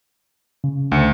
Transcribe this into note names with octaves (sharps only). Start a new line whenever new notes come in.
C#3
D2 C#7